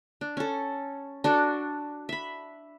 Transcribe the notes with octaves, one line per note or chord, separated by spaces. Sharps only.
D4
C#4 A4
D4 F#4 A4
E5 B5